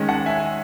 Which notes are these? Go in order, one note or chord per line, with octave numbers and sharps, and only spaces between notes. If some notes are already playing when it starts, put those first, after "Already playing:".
Already playing: D#3 G#3 C#4
F#5 A5
E5 G#5